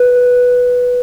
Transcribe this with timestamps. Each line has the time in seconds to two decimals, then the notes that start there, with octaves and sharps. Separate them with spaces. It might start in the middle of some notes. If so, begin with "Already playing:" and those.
Already playing: B4